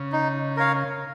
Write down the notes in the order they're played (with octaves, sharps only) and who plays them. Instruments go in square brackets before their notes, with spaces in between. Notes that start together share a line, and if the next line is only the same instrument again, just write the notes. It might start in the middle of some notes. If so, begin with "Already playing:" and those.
Already playing: [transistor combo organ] C#3
[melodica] D#4
A#4 C#5 F5